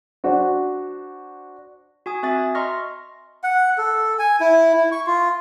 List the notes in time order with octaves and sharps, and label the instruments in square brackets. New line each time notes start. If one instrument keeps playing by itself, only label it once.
[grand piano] D4 F#4 C5
[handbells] F#4 G#5 D#6
C4 F#4 E5 G#5 D#6 A6
E5
D#5 A#5 C6 C#6 F6 A#6
[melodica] F#5
A4
G#5
E4
E4
C#6
F4